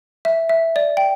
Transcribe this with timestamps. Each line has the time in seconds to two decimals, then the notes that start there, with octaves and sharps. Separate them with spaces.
0.25 E5
0.49 E5
0.76 D5
0.97 G5